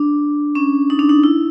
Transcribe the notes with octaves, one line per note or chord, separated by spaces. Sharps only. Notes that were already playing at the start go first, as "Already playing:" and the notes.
Already playing: D4
C#4
D#4
D4
D#4
E4